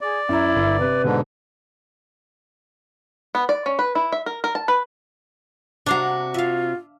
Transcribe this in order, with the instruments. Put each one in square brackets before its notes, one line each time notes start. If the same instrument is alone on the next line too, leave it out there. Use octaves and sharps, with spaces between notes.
[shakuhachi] G#4 [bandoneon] D5
[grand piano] F#2 A#5 [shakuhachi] E4
[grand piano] G1 E5
[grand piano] C3 [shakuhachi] B4
[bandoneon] G#2 D3 [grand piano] B2
[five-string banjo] B3
D5
C#4
B4
E4
E5
A#4
A#4
A5
B4
[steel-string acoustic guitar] C3 F#4 [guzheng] D4 F5 A#5
[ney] F4 [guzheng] E5 F5